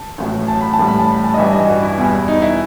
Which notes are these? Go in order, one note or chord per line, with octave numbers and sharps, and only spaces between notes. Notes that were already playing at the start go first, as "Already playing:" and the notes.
Already playing: A5
A1 A2 F#3
A5
B5
A5
A1 A2 G3
B5
A5
B5
A5
D#5
A1 G2 E3 G3 E5
D#5
F#4
E4
E2 B2 G3
D#4
E4